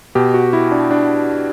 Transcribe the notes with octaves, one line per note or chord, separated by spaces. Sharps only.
B2 G4
F#4
E4
D4
D4